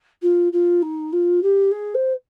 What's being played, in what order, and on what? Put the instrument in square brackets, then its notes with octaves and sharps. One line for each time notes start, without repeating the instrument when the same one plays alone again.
[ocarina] F4
F4
D#4
F4
G4
G#4
C5